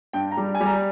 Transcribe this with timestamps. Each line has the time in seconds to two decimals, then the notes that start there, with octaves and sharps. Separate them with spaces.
0.13 G2 G5
0.31 A#5
0.37 G3
0.55 G#5
0.60 G3
0.66 A#5